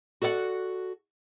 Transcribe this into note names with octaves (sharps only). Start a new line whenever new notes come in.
F#4 A4 D5 D#5 F#5